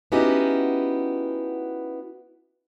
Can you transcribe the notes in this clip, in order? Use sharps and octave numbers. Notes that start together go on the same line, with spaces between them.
B3 C#4 D#4 E4 F#4 G4